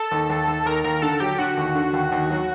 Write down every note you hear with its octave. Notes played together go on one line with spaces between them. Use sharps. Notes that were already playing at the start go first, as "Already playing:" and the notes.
Already playing: A4
D#2
D#2
D#2
D#2 A#4
D#2 A#4
D3 A4
F#3 G4
D3 F#4
D#2
D3
D#2
D#2
F#3